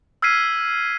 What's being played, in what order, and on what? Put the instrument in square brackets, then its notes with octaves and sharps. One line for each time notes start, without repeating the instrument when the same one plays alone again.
[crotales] E6 F6 G#6 B6 C7 D#7